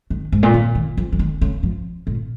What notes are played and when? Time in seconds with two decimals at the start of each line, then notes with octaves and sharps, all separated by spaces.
0.10 D#3
0.32 G#2
0.43 A#2
0.54 C#3
0.75 D#3
0.97 F3
1.12 F3
1.19 D#3
1.41 C#3
1.63 F3
2.07 A#2